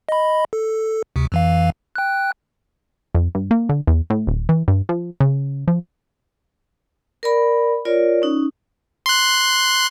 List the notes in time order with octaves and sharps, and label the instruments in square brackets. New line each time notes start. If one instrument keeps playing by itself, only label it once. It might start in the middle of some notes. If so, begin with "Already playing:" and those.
[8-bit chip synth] D#5 B5
A4
D2 C3
F2 E3 F5
G5 F#6
[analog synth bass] F2
G2
A#3
D3
E2
A2
D#1
E3
G2
F3
C#3
F3
[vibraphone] A#4 D5 B5
F4 A#4 C#5 D5
C#4 D#4
[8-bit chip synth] C6 F#6